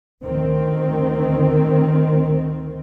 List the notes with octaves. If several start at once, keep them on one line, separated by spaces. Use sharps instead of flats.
D2 D#3 C4